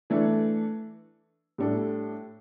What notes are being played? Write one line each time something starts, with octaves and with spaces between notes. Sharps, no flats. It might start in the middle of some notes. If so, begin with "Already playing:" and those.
E3 A3 D4 A4
A2 G3 D4 A4